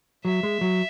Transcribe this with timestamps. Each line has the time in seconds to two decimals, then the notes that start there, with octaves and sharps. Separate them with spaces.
0.25 F#3 E5
0.43 G#3
0.61 F#3